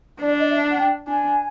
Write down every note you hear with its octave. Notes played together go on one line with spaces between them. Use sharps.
D4 D5
D#5
E5
F#5
G5
D4 G#5